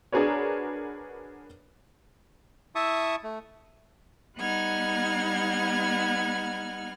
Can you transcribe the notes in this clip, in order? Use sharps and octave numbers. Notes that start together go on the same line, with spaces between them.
D4 F#4 G#4 A#4 B4 C#5
E4 E5 A5 C#6 D#6
A3
G3 B3 D#4 F#5 F6 G#6